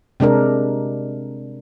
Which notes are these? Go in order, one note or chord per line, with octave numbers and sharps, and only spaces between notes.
C3 G#3 D4 A#4